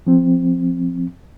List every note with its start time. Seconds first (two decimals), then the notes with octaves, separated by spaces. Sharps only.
0.07 F3 C4